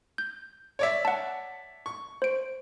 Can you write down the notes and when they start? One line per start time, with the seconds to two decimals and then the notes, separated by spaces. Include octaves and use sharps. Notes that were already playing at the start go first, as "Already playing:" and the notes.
0.18 G6
0.79 C#5 D5 E5
1.05 F#5 A5
1.86 C#6
2.22 C5 D7